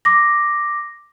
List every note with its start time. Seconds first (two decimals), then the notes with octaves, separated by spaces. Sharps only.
0.05 D6 A#6